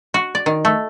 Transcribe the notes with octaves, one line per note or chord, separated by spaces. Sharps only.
F#4
D5
D#3
A3